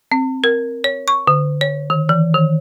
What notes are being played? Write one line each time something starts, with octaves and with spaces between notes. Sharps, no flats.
C4
A#4
C#5
C#6
D3
C#5
D#3
E3
D#3